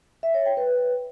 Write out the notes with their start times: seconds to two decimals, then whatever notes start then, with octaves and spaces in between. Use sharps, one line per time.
0.23 E5
0.34 C#5
0.46 G5
0.57 B4